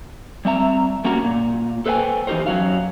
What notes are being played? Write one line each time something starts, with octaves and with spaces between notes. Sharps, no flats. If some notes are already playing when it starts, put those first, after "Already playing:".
G3 C4 E5 A#5
G3 A#3 C#4 F#4 A#4
A#2
A4 B4 C5 D#5 G5 G#5
E3 D#4 E4 G4 A#4 C5
F#2 F#3 G3 F#4 F5